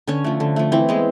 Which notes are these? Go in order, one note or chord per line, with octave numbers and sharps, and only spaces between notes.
D3 C#4
F3 A3
D3
F3 A3
E3 C4
G#3 B3